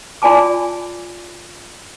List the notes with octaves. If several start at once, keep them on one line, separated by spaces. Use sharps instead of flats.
F4 D5 G#5 A5 D6